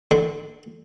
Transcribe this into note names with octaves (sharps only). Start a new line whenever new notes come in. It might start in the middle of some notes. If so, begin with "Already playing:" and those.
D3